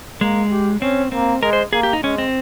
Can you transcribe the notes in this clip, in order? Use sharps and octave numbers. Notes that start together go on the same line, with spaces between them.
G#3 A#3
G4
C4 C#4
A#3 C4
G#3 A#4
C5
A#3 G#4
G4
D#4
G#3 C#4
C4